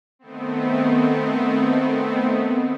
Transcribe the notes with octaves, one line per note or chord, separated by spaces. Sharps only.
D#3 A3 B3 C4